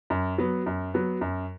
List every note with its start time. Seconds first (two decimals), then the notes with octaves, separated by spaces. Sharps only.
0.10 F#2
0.38 F#3 B3
0.66 F#2
0.94 F#3 B3
1.21 F#2